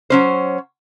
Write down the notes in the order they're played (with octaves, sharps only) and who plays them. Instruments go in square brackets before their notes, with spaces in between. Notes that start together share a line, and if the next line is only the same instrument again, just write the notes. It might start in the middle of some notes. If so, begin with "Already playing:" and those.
[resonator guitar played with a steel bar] F#3 C#4 C5